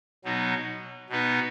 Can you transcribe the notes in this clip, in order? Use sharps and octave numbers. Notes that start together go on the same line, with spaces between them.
B2 F#3 B3 D#4
B2 B3 D#4 B4